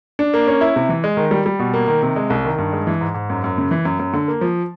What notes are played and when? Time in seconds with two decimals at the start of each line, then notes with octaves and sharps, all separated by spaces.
0.19 D4
0.34 A#3
0.47 C#4
0.61 E4
0.76 C3
0.89 E3
1.04 G#3
1.17 D#3
1.31 G3
1.46 G3
1.59 B2
1.74 A#3
1.88 D#3
2.03 C3
2.16 G#3
2.30 C2
2.45 D#3
2.58 G2
2.72 G#3
2.87 E3
3.01 G#2
3.14 G#2
3.30 F#2
3.44 F#2
3.58 C#3
3.71 E3
3.85 F#2
3.99 F#2
4.14 D3
4.28 A#3
4.41 F3